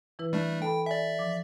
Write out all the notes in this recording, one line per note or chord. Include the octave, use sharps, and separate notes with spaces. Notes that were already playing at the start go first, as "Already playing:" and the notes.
E3 E4 B4
G3 A3 D4
A4 G5 A5 B5
D5 E5 G#5
F3 D6